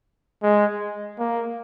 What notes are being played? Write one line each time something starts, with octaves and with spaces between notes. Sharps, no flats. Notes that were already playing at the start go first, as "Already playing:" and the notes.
G#3
A#3